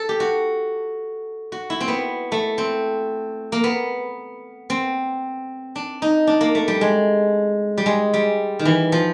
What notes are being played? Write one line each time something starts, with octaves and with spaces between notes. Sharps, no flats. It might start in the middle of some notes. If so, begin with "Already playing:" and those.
Already playing: A4
G4
F#4
F#4
E4
C4
B3
A3
C4
A#3
B3
C4
D4
D#4
D4
A#3
A3
G3
G#3
G3
G#3
G3
D#3
E3
F3